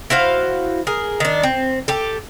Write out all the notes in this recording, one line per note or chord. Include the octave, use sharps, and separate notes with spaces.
E4 F#4 C5 F5
G#4 A#4
D#3 D4
C4
G4 A4